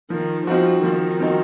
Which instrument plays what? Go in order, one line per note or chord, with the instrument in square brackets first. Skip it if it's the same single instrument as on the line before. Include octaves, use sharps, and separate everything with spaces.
[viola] D#3 [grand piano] F3
[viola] F3 [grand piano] C4 D#4 F#4
[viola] D#3 [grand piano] F3
[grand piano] C4 D#4 F#4